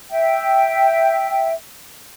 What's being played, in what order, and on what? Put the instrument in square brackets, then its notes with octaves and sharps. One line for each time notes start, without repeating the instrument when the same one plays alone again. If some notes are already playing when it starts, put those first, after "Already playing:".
[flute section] E5 G5